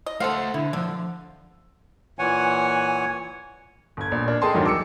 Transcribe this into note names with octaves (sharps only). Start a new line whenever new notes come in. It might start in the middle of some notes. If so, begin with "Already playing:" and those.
D#5
A3 A4 C5 F5 F#5
D3 E4
D3 E3 F3
A#2 E3 C#5 F#5 G#5
G1 G#6
A#1
D4 A#4
G#4 A4 D#5 G5 A5 C6
E2 G2 D#3 F#3 A3
D6 E6 C#7